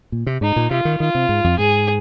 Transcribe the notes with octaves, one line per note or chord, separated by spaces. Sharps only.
A#2
C3
G#2 D#4
A#2
C3 F4
D#3
D#3 F4
C3
G#2
F2
G#2 G#4